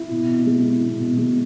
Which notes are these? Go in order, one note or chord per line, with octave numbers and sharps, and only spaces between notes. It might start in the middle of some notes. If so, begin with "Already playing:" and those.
Already playing: E4
B2
B2
G#3
E4
B2
B2
G#3